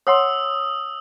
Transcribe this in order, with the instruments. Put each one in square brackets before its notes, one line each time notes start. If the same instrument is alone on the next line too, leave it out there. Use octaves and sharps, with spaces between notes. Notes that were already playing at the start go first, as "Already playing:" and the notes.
[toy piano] C#5 F#5 C6 [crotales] D#6 E6